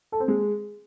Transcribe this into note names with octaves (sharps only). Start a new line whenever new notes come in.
A4
C4
G#3